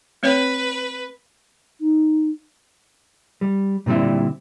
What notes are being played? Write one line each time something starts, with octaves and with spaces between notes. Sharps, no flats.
A3 C4 B4 C#5
D#4
G3
A#2 D3 G3 C4 E4